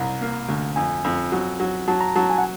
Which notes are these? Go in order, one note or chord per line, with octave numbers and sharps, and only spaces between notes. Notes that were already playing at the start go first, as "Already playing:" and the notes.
Already playing: C2 A#5
A#3
D2
F2 G#5
F2
F#3
F#3
F#3 A5
A#5
F#3 A5
G#5
F#5